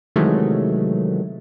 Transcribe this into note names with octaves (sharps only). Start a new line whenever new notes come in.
C3 D#3 E3 F#3 G#3 A3